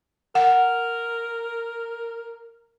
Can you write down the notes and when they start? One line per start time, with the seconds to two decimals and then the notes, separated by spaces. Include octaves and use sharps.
0.35 A#4 F#5